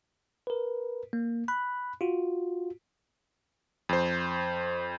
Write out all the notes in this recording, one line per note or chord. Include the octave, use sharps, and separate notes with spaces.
A#4 B4
A#3
B5 F#6
F4 F#4
F2 C5